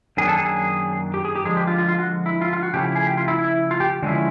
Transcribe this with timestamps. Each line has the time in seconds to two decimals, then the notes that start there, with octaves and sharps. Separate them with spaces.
0.17 F#2 D#3 F#3 A#3 D4 G#4
0.28 A4
0.38 G#4
1.14 G4
1.25 G#4
1.36 G4
1.45 D3 F3 G#3 G#4
1.57 G4
1.67 F4
1.78 F4
1.88 F4
1.99 F#4
2.26 E4
2.41 F4
2.53 F4
2.63 F#4
2.74 C#3 F3 A3 C#4 E4 G4
2.96 G#4
3.07 G4
3.17 F4
3.28 E4
3.38 E4
3.71 F4
3.80 G4
4.02 D3 F3 G#3 C#4 E4